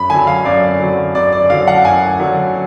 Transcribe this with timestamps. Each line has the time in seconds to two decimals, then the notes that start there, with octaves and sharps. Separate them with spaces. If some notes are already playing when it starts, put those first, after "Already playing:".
Already playing: F#2 B5
0.10 D3 F#3 G#5
0.27 F5
0.45 F#2 D5
0.80 D3 F#3
1.15 F#2 D5
1.32 D5
1.50 D3 F#3 F5
1.68 F#5
1.85 F#2 G#5
2.20 D3 F#3